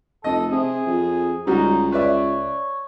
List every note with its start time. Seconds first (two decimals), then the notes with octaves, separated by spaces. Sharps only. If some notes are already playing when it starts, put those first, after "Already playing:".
0.24 F1 A4 D#5
0.52 C3 G#4
0.87 F2
1.47 C#2 G3 D#4 F#4
1.92 B4 C#5 D5 E5